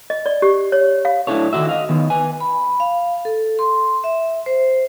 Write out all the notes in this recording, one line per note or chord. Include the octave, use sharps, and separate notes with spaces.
D#5
D5
G4
C#5
F5
A2 D4 E4 A4 C#5
D3 D#3 D4 F#4 E5
D#5 F5
D#3 B3
B4 G#5
B5
F5
A4
C6
E5
C5